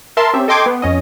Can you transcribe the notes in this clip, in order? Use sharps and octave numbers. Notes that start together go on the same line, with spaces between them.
A#4 E5 A5 C6
C4 C#4 G4 E5
A4 D#5 G5 C6 D6 G#6
B3
F2 C#4 D#5